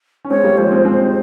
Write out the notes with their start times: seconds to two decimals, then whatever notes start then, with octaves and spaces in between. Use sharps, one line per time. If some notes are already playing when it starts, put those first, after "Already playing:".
0.25 C#4
0.30 G#3 C4 C#5
0.44 G3 A#3
0.58 F3 G#3 C5
0.71 G#3 C4
0.85 G#3 C4
1.01 C4